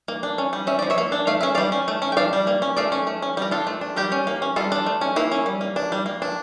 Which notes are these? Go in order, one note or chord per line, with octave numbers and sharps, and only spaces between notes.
A#3
D4
C#4
G3
C#4 E5
F3 D5
C#5 E5
A#3
D4
A3 F5
C#4 E5
G3 D5 F5
C#4
A3
C#4
G5
D4 D5 F5
G3
A#3
C#4
A3 D5 F5
C#4
A3
C#4
G3 A#4
D4 F4 A4
A3
D4
G3 G4 A#4
C#4
A#3
C#4
G3 F4 A4
D4
A3
C#4
A#3 E4
C#4
G3
A#3
D4
G3
A#3
D4